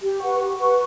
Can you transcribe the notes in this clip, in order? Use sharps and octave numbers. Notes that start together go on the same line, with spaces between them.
G4
B4 F#5 C#6
G4
B4 F#5 C#6